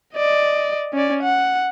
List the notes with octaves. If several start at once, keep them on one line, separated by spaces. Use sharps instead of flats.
D5 D#5
C#4 D5
F#5